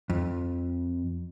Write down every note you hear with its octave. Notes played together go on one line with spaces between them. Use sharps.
F2